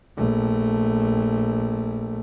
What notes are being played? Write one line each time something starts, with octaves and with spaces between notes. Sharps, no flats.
A#1 A3